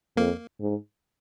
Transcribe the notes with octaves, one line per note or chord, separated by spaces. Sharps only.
F2 A#3
G#2